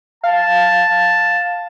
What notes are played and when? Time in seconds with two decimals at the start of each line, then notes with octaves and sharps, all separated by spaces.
0.24 F5 A5